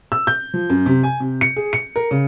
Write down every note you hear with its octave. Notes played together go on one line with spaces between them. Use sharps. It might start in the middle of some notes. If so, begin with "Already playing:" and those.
E6
G6
F3
F#2
C3
G#5
C3
C#7
G#4
C#7
A#4
C#3